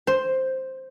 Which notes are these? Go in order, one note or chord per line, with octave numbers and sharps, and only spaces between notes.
C5